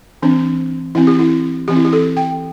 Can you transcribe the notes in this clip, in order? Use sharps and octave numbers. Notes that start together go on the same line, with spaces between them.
E3 C4 D4
E3 C4 E4
G4
E4
E3 C4 G4
E4
G4
A4
G5